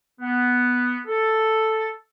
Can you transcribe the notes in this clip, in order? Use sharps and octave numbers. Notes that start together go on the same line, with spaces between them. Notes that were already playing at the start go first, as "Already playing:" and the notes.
B3
A4